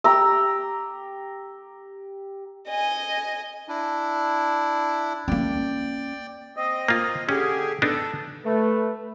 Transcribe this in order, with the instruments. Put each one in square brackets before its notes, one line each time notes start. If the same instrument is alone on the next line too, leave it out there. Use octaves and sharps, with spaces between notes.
[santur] G4 A#5 E6
[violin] D#5 G#5
[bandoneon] D4 E4
[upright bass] A#3 C#4 [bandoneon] D5 G5
[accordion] C4 D#5
[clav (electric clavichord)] A#3 F4
[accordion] D3 G4 G#4 [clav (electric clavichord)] C#4
[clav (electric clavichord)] B3 D4 D#4 [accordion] A4
[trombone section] A3 [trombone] B4